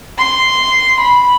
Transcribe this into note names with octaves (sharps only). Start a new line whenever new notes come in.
C6
B5